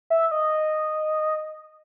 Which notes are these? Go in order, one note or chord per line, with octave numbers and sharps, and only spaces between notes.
E5
D#5